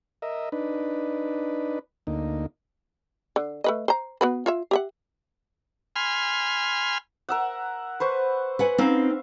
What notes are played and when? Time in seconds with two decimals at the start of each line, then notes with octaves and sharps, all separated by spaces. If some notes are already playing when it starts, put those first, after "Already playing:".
0.22 A#4 D#5 E5
0.52 D4 D#4 B4
2.07 D2 A#3 D#4
3.36 D3
3.64 A3 B4 D#5
3.88 C5 A#5
4.21 B3 F#4 B4
4.46 F4 C#5 E5
4.71 G4 E5 F#5
5.96 G#5 B5 C6 F6
7.29 A#4 E5 F#5
8.00 B4 C5 C#6
8.59 B4 F#5 G#5
8.78 C4 C#4 D#4 E5 F5